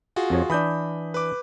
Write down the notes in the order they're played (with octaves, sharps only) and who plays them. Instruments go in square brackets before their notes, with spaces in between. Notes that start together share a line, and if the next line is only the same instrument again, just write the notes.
[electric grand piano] F4 F#4 G#4
[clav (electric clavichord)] F2 F3 C#5
[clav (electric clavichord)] E3 D4 [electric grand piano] B5 D#6 G6
[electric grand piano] B4 D6